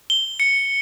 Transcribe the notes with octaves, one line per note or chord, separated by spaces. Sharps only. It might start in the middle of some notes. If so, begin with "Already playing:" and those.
G7
C#7